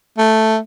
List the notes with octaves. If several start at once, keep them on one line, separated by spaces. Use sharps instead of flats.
A3